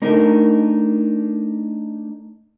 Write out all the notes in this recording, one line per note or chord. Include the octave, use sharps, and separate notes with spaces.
A3 D4 D#4 A#4